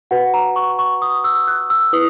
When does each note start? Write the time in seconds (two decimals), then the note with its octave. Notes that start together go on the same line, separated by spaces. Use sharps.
0.11 F#4 B4 F#5
0.34 A#5
0.56 C#6
0.79 C#6
1.02 D#6
1.24 E6
1.48 F#6
1.70 E6
1.93 E4 B4 D#6